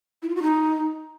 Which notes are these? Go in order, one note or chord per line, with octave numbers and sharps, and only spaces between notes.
E4
F4
F#4
D#4